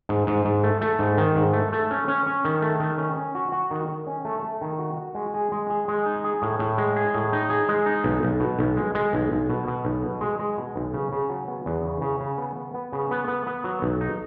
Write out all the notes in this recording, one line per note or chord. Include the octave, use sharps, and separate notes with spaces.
G#2
G#2
G#2
A3
A3
G#2
D#3
G#2
A3
A3
C#4
C#4
C#4
D#3
A3
D#3
C#4
C#4
F#4
F#4
D#3
D#3
C#4
A3
A3
D#3
F#4
F#4
G#3
G#4
G#3
G#4
G#3
D#4
G#4
A2
A2
G#3
G#4
A2
D#4
G#4
G#3
D#4
B1
B1
B2
B1
G#3
G#3
B1
B1
B2
B2
B1
B2
G#3
G#3
B2
B1
C#3
C#3
F#3
B3
E2
C#3
C#3
C#3
B3
B3
B3
C#3
B3
B3
B3
F#3
B1
D#4